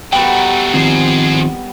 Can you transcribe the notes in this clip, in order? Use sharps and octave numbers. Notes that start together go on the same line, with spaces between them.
F#3 G3 A3 B3 A#4 G5
D#3 F3 C4 G#4 C5